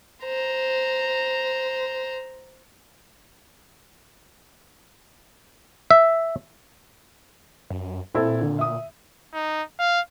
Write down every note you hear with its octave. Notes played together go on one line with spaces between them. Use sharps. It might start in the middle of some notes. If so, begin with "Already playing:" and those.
C5 A#5
E5
F#2
A#2 C4 E4 A4
D3
E5 D#6
D#4
F5